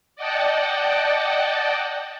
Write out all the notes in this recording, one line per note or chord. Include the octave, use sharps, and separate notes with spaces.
D5 D#5 F#5 G5 A5